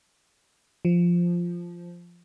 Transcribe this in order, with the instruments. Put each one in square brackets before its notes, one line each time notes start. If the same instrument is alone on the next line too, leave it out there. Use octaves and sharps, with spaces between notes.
[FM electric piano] F3